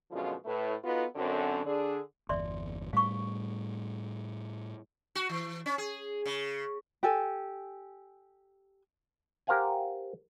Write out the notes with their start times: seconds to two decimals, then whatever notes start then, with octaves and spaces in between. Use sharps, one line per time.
0.11 F#2 B2 D3 F3 G#3 F4
0.45 A2 A3 B4
0.84 B3 D#4 F4 F#4 A4 B4
1.16 F#2 D3 C4
1.65 D3 D4 G#4
2.29 G1 E2 D5 E5 C6
2.93 A2 G3 F5 C#6
5.15 F#4
5.29 E3
5.66 C#4
5.78 G#4
6.25 C#3
7.03 G4 A4 G#5
9.47 G4 A#4 C5 F5 F#5 G#5